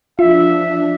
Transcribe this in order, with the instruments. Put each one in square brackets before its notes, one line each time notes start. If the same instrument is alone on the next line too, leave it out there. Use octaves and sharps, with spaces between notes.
[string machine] F3 D4 [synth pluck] F4 [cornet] E5